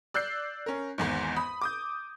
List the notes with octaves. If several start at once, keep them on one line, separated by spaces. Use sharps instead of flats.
D5 E6 F#6 G6 C7
C#4 A#4
G#1 E2 G#2
B5 D#6
D6 D#6 G6